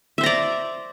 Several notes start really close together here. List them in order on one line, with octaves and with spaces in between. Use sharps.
E5 C5 A#5 D5